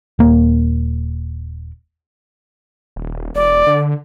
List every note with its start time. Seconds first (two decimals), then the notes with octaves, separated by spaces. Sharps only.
0.19 D#1 A#3
2.96 D#1
3.35 E1 D5
3.67 D3